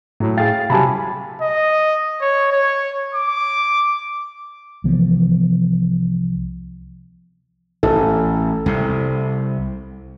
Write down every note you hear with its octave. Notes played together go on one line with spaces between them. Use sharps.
A2 F#3 A3
G#4 F5 G5 A6
C3 F#3 G3 G#5 A5 B5
D#5
C#5
C#5
D6
C2 E3 F3 B3
A1 A4
C2 C3